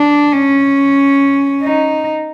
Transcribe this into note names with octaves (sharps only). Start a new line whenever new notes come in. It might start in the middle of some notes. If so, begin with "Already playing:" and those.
Already playing: D4
C#4
D#4